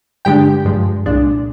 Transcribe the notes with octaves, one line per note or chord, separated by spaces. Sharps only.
G2 D3 G#3 D4 G4 G5
G2 F3 G#3
C2 A#2 G#3 D4